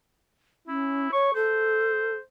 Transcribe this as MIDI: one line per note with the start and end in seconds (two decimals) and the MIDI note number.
0.67 1.08 61
0.67 1.11 64
1.12 1.30 73
1.12 1.31 85
1.35 2.13 69
1.35 2.22 72